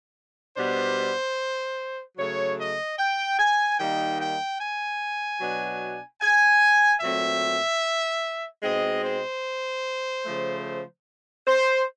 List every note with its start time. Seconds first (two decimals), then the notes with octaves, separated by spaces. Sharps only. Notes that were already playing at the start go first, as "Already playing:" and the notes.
0.56 B2 G3 B3 D4 C5
2.17 C#3 F#3 A3 C#5
2.59 D#5
2.99 G5
3.39 G#5
3.80 D#3 G3 A#3 D#4 G5
4.20 G5
4.61 G#5
5.40 B2 F#3 B3 D4
6.22 G#5
7.01 A#2 F#3 A3 C4 E5
8.63 B2 G#3 C4 D#4 D#5
9.03 C5
10.25 C#3 F3 A3
11.46 C5